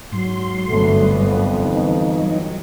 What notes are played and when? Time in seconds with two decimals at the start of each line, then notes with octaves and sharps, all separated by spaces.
0.12 G#2 F#3 C6
0.70 G1 C2 A3 B3
1.25 F2
1.64 E3 D#4
2.16 F#3